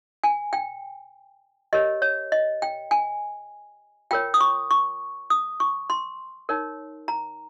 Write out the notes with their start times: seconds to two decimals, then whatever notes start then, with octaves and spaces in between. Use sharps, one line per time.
0.24 G#5
0.53 G5
1.73 G4 A#4 C#5 D#5
2.02 C#5
2.32 D#5
2.62 G5
2.91 G#5
4.11 F4 A#4 C#5 G5
4.34 D#6
4.41 C#6
4.71 C#6
5.30 D#6
5.60 C#6
5.90 C6
6.49 D#4 A#4 C#5
7.08 A#5